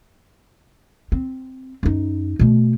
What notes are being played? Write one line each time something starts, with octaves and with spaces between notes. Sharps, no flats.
C4
F#2 D#4
B2 A3